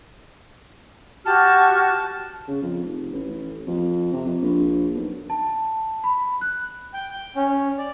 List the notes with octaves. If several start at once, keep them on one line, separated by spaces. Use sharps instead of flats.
F#4 G4 A5 F6
C#3
F2
F1
A1
F2
C3
F2
A#1
B1
A5
B5
F#6
G5
G5
C#4
C#4
D5